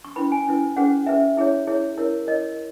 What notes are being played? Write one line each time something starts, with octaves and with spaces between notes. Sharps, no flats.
C#6
C#4 E4 B4 B5
G#5
C#4 E4 B4
C#4 G#4 B4 F#5
C#4 G#4 B4 E5
E4 G#4 C#5
E4 G#4 C#5
E4 A#4 C#5
E4 A#4 C#5 D#5